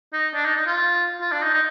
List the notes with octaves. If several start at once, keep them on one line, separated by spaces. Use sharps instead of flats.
D#4
D4
D#4
D#4
F4
F4
D4
D#4
D#4